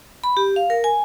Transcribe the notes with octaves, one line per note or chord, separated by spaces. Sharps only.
B5
G4
F5
A#4
G#5